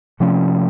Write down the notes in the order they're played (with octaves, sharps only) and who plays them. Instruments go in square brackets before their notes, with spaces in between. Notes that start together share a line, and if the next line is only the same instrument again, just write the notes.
[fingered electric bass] C3 F3 A3 C#4